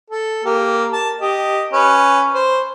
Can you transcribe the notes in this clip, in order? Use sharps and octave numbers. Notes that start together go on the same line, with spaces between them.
A4
A#3 G4
A5
G4 D#5
C#4 B4
C5